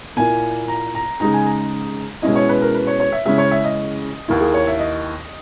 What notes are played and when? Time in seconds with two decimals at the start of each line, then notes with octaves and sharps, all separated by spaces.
0.17 A#2 A#3 E4 G#5
0.68 A#5
0.95 A#5
1.20 C#3 G#3 D#4 A#5
1.33 G#5
1.46 A#5
2.22 B2 G#3 C#4 E4 D#5
2.35 C#5
2.49 B4
2.61 A#4
2.74 B4
2.87 C#5
3.00 C#5
3.12 E5
3.26 C#3 G#3 C#4 E4 E5
3.38 C#5
3.51 E5
3.64 D#5
4.28 D#2 D#3 A#3 E4
4.41 G#4
4.54 C#5
4.67 E5
4.79 D#5